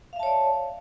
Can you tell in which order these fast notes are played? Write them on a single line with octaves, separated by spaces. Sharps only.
F5 E5 A5 C#5 D5